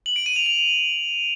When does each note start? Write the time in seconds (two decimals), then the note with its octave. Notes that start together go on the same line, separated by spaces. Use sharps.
0.06 F#7
0.16 D7
0.26 D#7
0.36 F7
0.46 F7